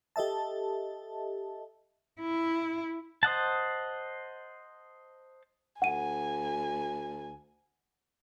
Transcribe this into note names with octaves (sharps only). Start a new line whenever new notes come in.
G4 A4 D#5 E5 A5
E4
C5 D#5 F#5 A5
D2 F#5 G#5 D#7